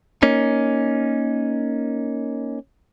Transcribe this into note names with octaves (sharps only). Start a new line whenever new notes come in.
A#3 C#4 D#4